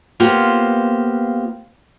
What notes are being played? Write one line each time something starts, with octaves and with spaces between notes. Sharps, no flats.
A#3 B3 F4 G4 C5